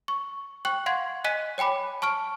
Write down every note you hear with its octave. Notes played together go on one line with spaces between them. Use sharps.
C#6
G5 C#6 F#6 F#7
F5 F#5 C6 G#6
D#5 G#5 F#6 B6 D#7
C#5 G5 G#5 B5 D6
A5 C#6 F6 D7